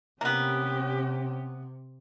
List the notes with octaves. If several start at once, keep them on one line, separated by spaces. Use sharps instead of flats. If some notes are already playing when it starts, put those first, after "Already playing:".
C3 A#3 B3 C#4 G4